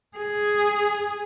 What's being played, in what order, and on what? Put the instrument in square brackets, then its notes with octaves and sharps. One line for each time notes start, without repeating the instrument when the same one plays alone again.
[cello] G#4